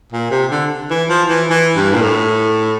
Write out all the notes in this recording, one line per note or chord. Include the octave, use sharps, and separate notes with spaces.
A#2
C3
D3
E3
F3
E3
E3
G2
A#2
A2